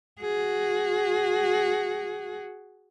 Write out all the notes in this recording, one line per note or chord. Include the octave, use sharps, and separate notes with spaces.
F#4 G#4